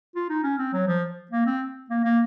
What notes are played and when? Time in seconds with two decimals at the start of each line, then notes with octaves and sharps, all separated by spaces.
0.15 F4
0.29 D#4
0.44 C#4
0.58 C4
0.73 F#3
0.87 F3
1.31 A#3
1.46 C4
1.90 A#3
2.04 A#3